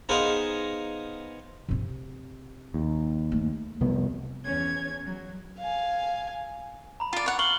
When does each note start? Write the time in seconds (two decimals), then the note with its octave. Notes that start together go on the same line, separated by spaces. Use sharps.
0.09 B3 D#4 G#4 A#4 C5 F5
1.69 C3 C4
2.74 D#2
3.32 A3
3.81 C2 F2 C3 B3
4.43 E2 C#4 C#5 G#6
5.04 F#3
5.59 F5 G#5
7.00 A#5 B5
7.13 F4 D5
7.26 C#5 F#5
7.39 F5 C#6 F#7 G7